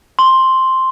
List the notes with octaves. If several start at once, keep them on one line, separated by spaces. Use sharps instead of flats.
C6